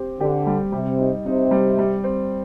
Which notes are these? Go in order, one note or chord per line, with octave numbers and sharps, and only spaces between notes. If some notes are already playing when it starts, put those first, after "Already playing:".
Already playing: C4 G4
D3 G4
G3
C3 G3
D#4
C3 D#4
G3
G3
C4